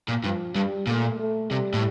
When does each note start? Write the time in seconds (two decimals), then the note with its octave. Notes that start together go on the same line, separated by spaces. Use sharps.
0.08 A#2
0.24 G2 F3
0.55 G2 G3
0.87 A#2 A3
1.19 A3
1.51 C3 G3
1.74 A2